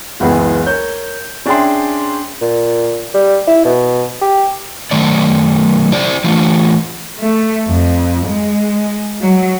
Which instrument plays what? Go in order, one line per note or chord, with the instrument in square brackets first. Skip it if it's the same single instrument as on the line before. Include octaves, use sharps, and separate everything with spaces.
[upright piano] F#1 C#2 E3 B3 G#4
A#4 C#5 G6
C#4 D4 G#4 E5 G5 C6
[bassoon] A#2
G3
E4
B2
G4
[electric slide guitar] F#2 D#3 A3 D5
E4 G4 C5 D5
E3 A3 F4
[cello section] A3
F2
G#3
F#3